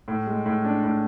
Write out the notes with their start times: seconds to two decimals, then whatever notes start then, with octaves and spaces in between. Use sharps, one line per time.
0.08 A2
0.27 G#3
0.46 A2
0.64 D4
0.84 A2